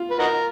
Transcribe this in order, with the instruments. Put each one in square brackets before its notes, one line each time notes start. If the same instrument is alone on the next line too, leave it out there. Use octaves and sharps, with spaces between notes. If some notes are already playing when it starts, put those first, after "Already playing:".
Already playing: [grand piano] F4
[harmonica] B4
D#4 F#4 A#4